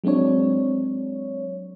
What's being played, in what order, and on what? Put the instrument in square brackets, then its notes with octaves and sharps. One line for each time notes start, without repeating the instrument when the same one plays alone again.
[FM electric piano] F#3 G#3 C4 D4 C#5